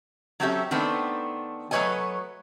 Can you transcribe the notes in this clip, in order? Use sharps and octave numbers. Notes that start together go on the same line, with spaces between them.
F#3 C4 C#4 G4 A4 E5
D#3 A3 B3 C4 D4
F#3 A3 B4 C#5 D#5 G#5